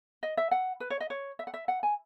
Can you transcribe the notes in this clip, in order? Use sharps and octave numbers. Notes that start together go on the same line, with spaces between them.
D#5
E5
F#5
B4
C#5
D#5
C#5
E5
F#5
E5
F#5
G#5